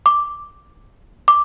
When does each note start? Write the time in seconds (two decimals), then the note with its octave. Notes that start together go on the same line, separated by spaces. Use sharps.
0.06 D6
1.28 D6